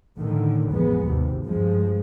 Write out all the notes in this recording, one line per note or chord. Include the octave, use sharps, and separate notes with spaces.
A2 D3 D#3
A1 F2 G#3 B3
G#1 D#2 C3
G2 F3 G#3